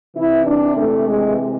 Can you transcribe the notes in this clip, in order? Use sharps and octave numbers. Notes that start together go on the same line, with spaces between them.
C3 E3 E4
D4
A3
G#3